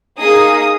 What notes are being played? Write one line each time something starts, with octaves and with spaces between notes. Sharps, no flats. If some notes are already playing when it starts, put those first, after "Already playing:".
A#3 D#4 G#4 D#6